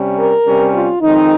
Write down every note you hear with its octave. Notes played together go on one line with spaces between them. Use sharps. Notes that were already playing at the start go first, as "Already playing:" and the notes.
Already playing: C3 G3 C#4
A#4
C3 G3 C#4
F4
F2 D#3 G#3 C4 D#4